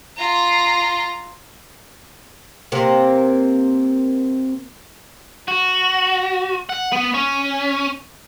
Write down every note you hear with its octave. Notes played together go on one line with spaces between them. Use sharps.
F4 A#5
C3 A#3
F#4
F#5
B3
C#4